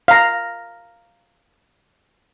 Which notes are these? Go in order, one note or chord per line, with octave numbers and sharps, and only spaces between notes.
F5 A#5